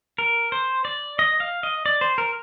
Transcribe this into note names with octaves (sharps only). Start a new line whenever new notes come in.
A#4
C5
D5
D#5
F5
D#5
D5
C5
A#4